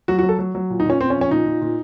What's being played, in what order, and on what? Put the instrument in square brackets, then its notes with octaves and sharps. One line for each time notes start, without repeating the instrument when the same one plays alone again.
[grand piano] F#3 F#4
F#4
F#3
A4
F#3
F#3
A#2
D#4
A#2 C#4
A#2 C4
C#4
F3
C#4
A#2 D#4
A#2
A#2